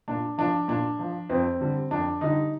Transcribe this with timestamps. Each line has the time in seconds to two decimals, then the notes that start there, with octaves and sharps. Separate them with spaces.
0.08 A#2 D4
0.38 F3 D4
0.68 A#2 D4
0.99 F3
1.30 F2 C4
1.61 D3 G3
1.91 F2 D4
2.21 D3 G3 D#4